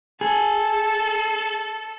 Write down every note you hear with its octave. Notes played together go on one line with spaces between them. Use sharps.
G#4 A4